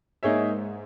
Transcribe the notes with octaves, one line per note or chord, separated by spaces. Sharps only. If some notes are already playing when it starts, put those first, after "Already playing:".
G#2 A#3 D#4 G#4 C#5 E5